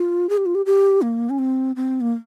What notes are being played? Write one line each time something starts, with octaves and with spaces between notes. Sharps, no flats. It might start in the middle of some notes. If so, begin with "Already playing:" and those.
Already playing: F4
G#4
G4
F4
G4
G4
A#3
C#4
C4
C4
A#3